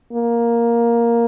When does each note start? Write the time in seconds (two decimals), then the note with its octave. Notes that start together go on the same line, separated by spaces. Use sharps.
0.13 A#3